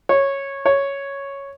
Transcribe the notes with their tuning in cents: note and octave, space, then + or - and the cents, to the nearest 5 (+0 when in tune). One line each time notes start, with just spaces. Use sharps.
C#5 -10
C#5 +0